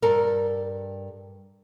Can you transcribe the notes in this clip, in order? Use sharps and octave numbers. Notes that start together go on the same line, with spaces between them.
G2 A4 A#4